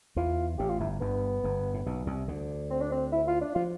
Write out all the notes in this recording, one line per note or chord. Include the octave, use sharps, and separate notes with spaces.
E2 E3 F4
A1 A2 G4
F4
G1 G2 E4
G1 G2 B3
G1 G2
A2
B1 B2
C2 C3
D2 D3
C4
D4
C4
E4
F4
D4
F3 F4